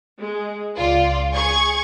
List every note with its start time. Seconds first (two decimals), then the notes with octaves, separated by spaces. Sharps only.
0.19 G#3
0.77 C#2 F4 D5
1.32 G#4 C#6 G#6